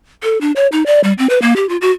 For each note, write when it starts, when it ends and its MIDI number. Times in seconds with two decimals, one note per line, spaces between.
0.23 0.40 69
0.41 0.52 62
0.56 0.67 73
0.72 0.83 63
0.86 1.00 74
1.04 1.13 55
1.18 1.29 60
1.30 1.41 71
1.42 1.54 58
1.56 1.68 67
1.69 1.77 65
1.81 1.91 66